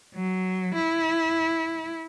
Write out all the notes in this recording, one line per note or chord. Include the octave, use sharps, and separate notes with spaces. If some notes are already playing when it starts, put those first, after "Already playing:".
F#3
E4